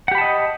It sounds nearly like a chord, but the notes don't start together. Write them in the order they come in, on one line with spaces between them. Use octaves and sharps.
F#5 G4 B5 A5 D#5